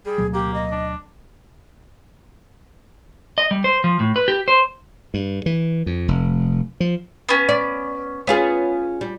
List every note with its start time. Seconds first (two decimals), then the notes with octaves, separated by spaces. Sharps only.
0.06 G3 G#4
0.18 D2 B2 F#3
0.34 A#3 G4
0.54 D#5
0.72 D4
3.38 D#5
3.51 G3
3.64 C5
3.84 F3
4.00 A2
4.16 B4
4.28 G4
4.48 C5
5.14 G2
5.46 E3
5.86 F2
6.08 F1
6.80 F3
7.29 B3 C#4
7.49 D5
8.27 B3 C#4 F4 G#4
9.01 G3